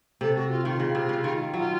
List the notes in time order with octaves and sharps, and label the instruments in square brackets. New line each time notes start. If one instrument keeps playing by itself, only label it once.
[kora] C3 [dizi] A4
[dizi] F#4
F4
[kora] D#3 [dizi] F4
[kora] C#3
C3
C#3
D#3
[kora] F#3 [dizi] F4